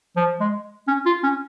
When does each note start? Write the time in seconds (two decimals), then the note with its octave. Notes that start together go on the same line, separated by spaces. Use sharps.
0.17 F3
0.40 G#3
0.88 C#4
1.06 F4
1.23 C#4